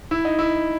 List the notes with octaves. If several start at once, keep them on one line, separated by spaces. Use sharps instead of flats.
E4
D#4
E4